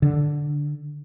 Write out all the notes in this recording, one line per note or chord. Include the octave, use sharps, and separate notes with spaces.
D3